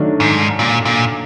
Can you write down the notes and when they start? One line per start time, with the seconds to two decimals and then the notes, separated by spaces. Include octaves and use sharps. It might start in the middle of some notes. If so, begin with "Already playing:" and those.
Already playing: D#3 F#3 A3 D4
0.20 G#2
0.59 A#2
0.85 A#2